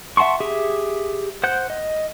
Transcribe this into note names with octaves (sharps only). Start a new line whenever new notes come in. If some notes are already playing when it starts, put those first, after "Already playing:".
E5 F#5 A5 C6 C#6
G4 G#4 E5
C5 F#5 F#6 G6
D#5